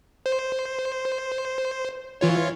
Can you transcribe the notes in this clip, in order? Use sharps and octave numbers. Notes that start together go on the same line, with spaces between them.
C5
E3 F4 C#5